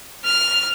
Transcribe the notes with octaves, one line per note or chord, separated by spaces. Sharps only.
F6